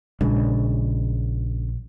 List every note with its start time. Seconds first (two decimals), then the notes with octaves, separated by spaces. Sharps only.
0.21 A#1 C#3 G#3 D4